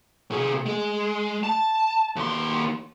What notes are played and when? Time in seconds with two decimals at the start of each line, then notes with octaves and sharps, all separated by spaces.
0.31 C3 G#4
0.66 G#3
1.43 A5
2.16 D#2 C6